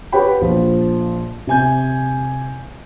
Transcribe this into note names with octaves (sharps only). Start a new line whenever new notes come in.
F#4 G4 B4 C#5 G5 B5
A#1 F3
C3 G#5 G6